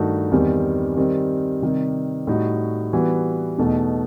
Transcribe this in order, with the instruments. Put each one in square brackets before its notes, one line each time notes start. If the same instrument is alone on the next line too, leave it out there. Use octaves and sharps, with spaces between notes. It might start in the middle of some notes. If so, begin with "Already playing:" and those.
Already playing: [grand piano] G2 D#3 A3 D#4 F#4
E2 D#3 G3 C4
D#3 G3 C4
C3 D#3 G3
A2 G3 D#4 F#4
E3 G3 B3 F#4
E2 B2 A3 D#4